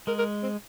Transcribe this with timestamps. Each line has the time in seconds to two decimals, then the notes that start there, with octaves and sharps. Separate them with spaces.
0.07 G#3 A#4
0.18 A#4
0.43 C4